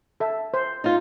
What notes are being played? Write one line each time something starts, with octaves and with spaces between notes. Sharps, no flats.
A4 E5
C5
D#4 F4